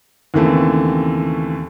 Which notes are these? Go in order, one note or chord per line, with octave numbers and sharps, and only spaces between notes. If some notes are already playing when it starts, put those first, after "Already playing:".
D#2 C#3 E3 A3 C4